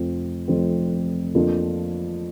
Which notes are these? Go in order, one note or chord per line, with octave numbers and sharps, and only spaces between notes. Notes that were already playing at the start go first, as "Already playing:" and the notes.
Already playing: F1 F2 F3 C4
F1 F2 F3 C4
F2 F3 A#3 D4